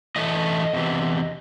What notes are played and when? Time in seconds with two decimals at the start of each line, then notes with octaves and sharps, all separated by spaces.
0.16 A2 E3 A3 D#5
0.74 E2 C3 E3